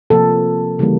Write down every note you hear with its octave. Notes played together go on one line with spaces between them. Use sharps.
C3 F3 A#3 A4
C#3 E3 G3 A#3